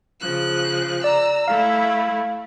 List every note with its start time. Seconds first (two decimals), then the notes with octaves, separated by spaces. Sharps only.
0.20 C#3 F3 F#6
1.04 D5 A#5 E6
1.48 A3 E4 F5